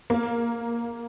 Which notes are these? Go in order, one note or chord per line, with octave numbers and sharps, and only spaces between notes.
A#3